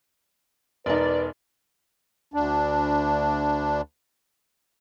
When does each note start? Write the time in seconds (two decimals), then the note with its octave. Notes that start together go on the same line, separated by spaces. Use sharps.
0.86 E1 D#4 B4 D5
2.34 D2 D4